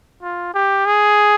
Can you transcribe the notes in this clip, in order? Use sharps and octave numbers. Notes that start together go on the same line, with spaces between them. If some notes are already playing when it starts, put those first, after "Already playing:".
F4
G4
G#4